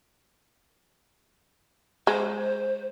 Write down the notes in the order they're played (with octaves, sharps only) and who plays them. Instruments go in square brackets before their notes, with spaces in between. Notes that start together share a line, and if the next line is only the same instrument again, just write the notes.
[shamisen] G#3 [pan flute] C5